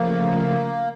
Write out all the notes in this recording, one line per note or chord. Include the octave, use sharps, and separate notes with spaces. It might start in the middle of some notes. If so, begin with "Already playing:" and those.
Already playing: C#3 F3 A3 A#3